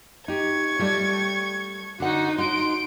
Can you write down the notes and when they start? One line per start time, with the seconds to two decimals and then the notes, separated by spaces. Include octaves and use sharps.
0.28 D#4 G4 C#6 G#6
0.79 G3 A3 D5
2.00 D3 D#4 F#4 F#5
2.38 D#4 F#4 C6 D7